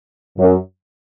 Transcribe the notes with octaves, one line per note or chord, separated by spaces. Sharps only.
F#2